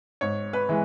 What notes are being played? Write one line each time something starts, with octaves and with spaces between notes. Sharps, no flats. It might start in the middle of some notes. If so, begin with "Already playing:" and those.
G#2 C#5
B4
E3 G#3